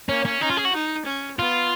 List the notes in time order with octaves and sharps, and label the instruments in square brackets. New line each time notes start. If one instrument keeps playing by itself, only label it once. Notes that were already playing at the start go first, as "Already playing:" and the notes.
[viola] A#3 [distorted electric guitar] C#4
[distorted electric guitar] C#4
[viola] C#4 [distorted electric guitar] D#4
[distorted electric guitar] F4
G#4
F#4
[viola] D#4
C#4
[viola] B3 [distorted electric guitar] F4